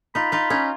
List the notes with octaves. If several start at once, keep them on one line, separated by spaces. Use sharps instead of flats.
D#4 F4 B5
D#4 F4
C#4 D#4